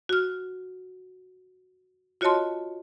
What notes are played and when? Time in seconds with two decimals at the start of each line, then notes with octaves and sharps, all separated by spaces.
0.09 F#4 F6
2.21 F4 F#4 C#5 D#5 A5 C6